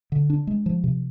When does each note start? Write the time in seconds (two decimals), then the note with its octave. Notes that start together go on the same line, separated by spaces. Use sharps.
0.12 D3
0.30 D4
0.47 G#3
0.66 F3
0.84 C3